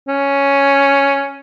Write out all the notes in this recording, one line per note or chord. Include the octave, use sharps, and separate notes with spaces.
C#4